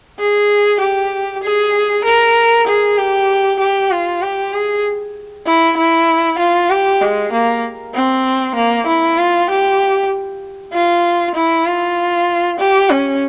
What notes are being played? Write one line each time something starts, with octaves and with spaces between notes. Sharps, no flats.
G#4
G4
G#4
A#4
G#4
G4
G4
F4
G4
G#4
E4
E4
F4
G4
G#3
A#3
C4
A#3
E4
F4
G4
F4
E4
F4
G4
C#4